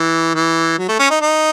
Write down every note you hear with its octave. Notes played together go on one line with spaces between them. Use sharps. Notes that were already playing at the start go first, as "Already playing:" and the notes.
Already playing: E3
E3
F#3
A3
C#4
D#4
D#4